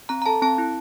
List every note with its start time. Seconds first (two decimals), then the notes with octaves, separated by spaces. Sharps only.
0.09 C4 A#5
0.22 A#5
0.26 A4 A5
0.42 C4 A5
0.58 E4